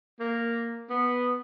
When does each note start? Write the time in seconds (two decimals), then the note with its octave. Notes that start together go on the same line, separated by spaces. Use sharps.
0.20 A#3
0.90 B3